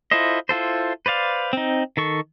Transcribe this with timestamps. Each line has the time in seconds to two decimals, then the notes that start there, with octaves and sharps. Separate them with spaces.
0.11 E4 F4 A4 C5 D#5
0.49 E4 F4 A4 C5
1.06 B4 C5 D5 F5
1.53 C4 D#4
1.97 D#3 A4 C#6